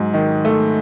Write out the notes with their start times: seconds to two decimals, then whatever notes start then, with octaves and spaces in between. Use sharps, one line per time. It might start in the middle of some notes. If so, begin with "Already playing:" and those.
Already playing: G#2 F#3
0.14 D#3
0.45 A3